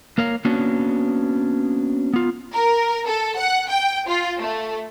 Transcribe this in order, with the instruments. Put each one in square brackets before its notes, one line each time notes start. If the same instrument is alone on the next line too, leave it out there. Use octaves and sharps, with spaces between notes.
[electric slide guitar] A#3 A#4 C#5 F5
A#3 B3 C#4 D4 F#4
B3 F4
[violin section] A#4
A4
F#5
G5
F4
A3